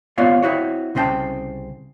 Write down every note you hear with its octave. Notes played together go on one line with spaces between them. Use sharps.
B3 C4 F4 C#5 D5 F5
C4 E4 F#4 C#5
C2 C#3 C4 F4 G5 A5